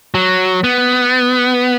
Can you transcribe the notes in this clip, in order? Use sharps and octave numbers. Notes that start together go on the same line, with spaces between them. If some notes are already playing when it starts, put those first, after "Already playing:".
F#3
B3